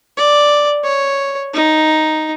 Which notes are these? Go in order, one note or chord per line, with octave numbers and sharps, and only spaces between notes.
D5
C#5
D#4